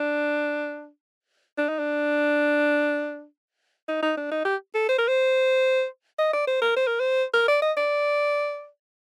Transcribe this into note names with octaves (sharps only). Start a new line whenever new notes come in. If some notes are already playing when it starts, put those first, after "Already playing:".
Already playing: D4
D4
D#4
D4
D#4
D#4
D4
D#4
G4
A4
C5
A#4
C5
D#5
D5
C5
A#4
C5
A#4
C5
A#4
D5
D#5
D5